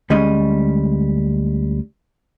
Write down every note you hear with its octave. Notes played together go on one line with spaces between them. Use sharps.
D2 G3 G#3 C#4 D#5